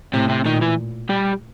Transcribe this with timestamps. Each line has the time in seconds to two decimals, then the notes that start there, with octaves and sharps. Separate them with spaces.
0.13 A2 C3 C4
0.29 C3 C4
0.45 A#2 D#3 D#4
0.61 E3 E4
1.09 G3 G4